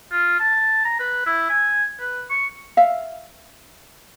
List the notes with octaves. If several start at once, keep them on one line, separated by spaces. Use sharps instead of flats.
F4
A5
A#5
B4
E4
G#5
B4
C#6
E5 F5